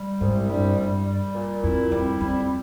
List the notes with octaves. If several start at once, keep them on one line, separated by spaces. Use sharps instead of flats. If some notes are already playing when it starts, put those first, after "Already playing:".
Already playing: G3
C2 G#2
G2 G3
G2 G3
G3
A#2
F2 E4
F2 G3
F2 E4